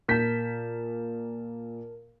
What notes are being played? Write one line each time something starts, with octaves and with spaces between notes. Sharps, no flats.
A#2 A#4 A5 G6 B6